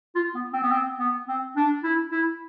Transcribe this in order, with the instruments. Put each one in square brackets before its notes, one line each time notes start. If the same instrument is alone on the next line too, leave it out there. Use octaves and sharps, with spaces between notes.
[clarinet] F4
B3
C4
B3
C4
B3
C4
D4
E4
E4